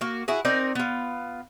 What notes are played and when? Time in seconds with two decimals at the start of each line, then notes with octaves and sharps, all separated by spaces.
0.01 A#3 F#4
0.28 E4 F#4 G#4
0.45 C4 D#4 A#4 D5
0.75 B3 F4